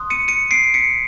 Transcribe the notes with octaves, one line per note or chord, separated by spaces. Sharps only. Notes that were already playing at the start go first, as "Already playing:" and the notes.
Already playing: C6 D#6 F#6
C#7 D#7
C#7 D#7
C7 D7
B6 C#7